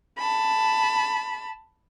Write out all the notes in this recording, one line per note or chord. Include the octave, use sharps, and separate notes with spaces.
A5 B5